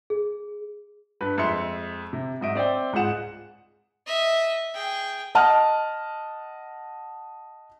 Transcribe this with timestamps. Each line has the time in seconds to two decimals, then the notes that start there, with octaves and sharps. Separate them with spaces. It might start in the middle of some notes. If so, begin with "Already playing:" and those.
0.10 G#4
1.21 G2 B4
1.38 F2 G#3 E5 C6 C#7
2.13 C3
2.41 G#2 F#3 D#5 E5 D7
2.55 C4 D5 E5 G5
2.93 C#2 G#2 F4 G#4 F#5 E7
4.07 D#5 E5
4.74 G#4 G5
5.35 D#5 F#5 A5 F6